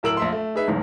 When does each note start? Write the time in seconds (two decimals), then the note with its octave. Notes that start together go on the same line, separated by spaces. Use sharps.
0.03 D1 A2 A#4 E6 D7 F#7
0.17 A#1 E5 C6
0.32 A3
0.55 D#4 G#4 B4 E5
0.68 F#1 E2 G#2